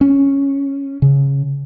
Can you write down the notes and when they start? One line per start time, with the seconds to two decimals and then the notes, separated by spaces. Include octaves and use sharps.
0.01 C#4
1.02 C#3